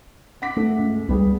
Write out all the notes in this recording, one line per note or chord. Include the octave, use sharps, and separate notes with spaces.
F#5 D6 B6
A3
C#2
C#2 G3 B3 G#4